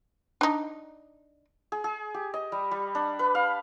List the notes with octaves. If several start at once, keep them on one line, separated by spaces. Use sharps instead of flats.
D4 D#4
G#4
G#4
G4
D#5
G3
G3
D4
B4
F5